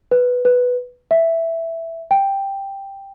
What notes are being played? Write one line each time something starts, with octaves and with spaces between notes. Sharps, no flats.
B4
B4
E5
G5